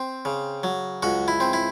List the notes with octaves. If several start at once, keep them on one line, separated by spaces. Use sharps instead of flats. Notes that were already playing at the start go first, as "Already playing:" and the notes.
Already playing: C4
C#3
F#3
C#2 F#4
E4
C4
E4